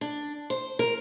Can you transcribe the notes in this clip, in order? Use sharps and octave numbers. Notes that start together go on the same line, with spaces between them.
D4
C5
A#4